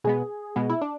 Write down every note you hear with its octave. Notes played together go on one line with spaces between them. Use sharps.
B2 G#3 B3 G#4
B2 G#3 B3
E4
D4